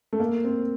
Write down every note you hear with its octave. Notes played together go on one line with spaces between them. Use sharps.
A3
A#3
C4